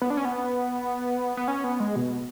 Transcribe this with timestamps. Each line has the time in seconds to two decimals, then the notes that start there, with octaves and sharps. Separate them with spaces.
0.02 B3
0.10 D4
0.17 C#4
0.25 B3
1.37 B3
1.48 C#4
1.64 B3
1.80 G#3
1.96 B2